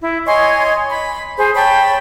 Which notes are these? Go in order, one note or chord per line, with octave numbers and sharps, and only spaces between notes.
E4
C#5 D#5 G#5 C6
B5
G#4 C5
C#5 G5 A5 B5